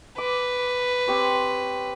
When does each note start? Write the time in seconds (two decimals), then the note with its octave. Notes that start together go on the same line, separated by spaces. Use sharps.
0.18 B4 D6
1.08 C4 G4 C#5